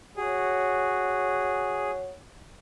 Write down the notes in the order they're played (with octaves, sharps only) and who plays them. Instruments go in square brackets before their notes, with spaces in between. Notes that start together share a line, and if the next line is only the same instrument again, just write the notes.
[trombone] F#4 [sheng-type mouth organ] G#4 [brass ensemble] C#5